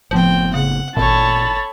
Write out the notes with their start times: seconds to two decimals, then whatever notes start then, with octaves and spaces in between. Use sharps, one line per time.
0.11 F#1 A2 F3 B3 C4 G5
0.54 C#3 F#5
0.97 G#1 A#2 A4 C#5 A5 B5